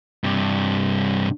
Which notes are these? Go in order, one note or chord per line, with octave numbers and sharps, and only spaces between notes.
G2 C3